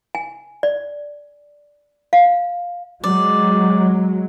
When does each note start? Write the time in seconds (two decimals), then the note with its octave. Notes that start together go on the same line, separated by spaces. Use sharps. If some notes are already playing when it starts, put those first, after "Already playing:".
0.15 G#5
0.63 D5
2.13 F5
3.04 F#3 G#3 D5